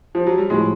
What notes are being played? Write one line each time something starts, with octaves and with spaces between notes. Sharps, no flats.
F3
F#3
G3
A2 F3 G#3